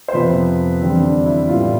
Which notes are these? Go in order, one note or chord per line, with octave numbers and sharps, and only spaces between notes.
C5
F2 C3 F3 B3 B4
E2 D3 G3 C4
D4
E4
A2 G3 B3 F4